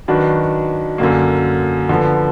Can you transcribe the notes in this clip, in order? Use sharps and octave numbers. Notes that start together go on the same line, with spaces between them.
D#3 F#3 D4 F#4 B4
F#2 D3 F#3 A#3
D3 F3 B3